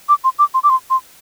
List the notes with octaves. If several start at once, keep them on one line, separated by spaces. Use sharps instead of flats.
D6
C6
D6
C6
D6
C6
C6